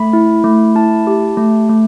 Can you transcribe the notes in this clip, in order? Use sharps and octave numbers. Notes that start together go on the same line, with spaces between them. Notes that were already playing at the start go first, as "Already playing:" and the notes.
Already playing: A3 B5
E4
A3
E4 A5
G4
A3
A3